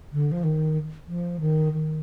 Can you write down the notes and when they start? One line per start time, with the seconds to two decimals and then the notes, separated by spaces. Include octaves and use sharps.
0.12 D3
0.32 F3
0.43 D#3
1.07 F3
1.40 D#3
1.72 D#3